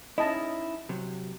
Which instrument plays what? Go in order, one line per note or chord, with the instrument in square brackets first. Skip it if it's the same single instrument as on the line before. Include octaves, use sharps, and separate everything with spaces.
[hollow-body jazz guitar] C#4 D#4 E4 [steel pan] D#5 A5
[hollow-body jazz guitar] C3 F#3